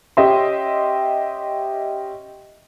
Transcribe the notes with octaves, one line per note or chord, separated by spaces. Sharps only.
C#4 G4 D#5 E5 C6